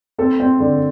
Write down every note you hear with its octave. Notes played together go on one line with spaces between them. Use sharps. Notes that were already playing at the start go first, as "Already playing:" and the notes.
C4 A4
C4
D3